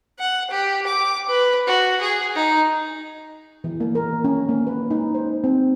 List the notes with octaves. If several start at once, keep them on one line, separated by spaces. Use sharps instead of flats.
F#5
G4
D6
B4
F#4
G#4
D#4
E3
A#3
A#4
C#4
A#3
B4
D#4
C5
C4